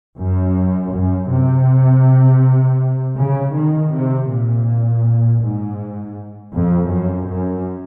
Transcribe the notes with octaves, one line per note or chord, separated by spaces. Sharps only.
F#2
F#2
C3
C#3
D#3
C3
A#2
G#2
F2
F#2
F#2